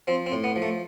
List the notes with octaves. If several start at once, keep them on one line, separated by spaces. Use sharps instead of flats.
F3 C4
C4
A2
B3
F3
A3